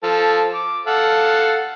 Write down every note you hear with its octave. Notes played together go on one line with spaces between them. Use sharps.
F3 A4
D6
A4 F5 F#5